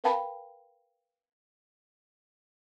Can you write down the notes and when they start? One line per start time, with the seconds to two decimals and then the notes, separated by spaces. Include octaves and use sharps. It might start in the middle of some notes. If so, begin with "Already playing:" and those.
0.04 A#4 B4 F5 G5 A5 B5